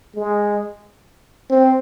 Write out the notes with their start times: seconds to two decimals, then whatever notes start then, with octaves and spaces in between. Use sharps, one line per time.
0.15 G#3
1.50 C4